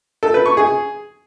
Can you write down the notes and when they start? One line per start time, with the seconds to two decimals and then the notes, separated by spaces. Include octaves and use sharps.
0.23 A4
0.34 B4
0.46 C#6
0.57 G#4